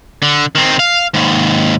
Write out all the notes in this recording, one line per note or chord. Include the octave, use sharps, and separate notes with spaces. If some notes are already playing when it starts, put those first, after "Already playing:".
D3
D#3 C4
F5
D#2 G#2